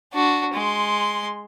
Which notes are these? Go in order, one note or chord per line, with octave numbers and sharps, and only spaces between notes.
D4 F#4
G#3 C6